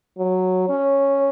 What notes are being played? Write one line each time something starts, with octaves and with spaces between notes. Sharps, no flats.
F#3
C#4